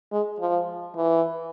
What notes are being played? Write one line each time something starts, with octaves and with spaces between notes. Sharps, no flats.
G#3
F3
E3